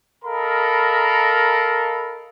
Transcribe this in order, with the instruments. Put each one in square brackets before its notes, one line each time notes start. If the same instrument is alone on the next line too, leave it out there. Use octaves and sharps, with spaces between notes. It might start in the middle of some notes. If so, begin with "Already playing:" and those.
[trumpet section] A4 A#4 D#5 F5 A#5 B5